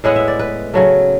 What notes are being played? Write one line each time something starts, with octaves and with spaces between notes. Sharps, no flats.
A2 G#3 B3 E4 F#5
E5
D5
B4
C#3 F#3 A3